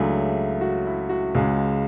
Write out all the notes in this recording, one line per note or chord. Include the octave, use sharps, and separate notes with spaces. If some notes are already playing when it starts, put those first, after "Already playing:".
Already playing: C#2 C#3 F#3 A3 D4 E4 G#4
F#4
E4
F#4
C#2 C#3 G#3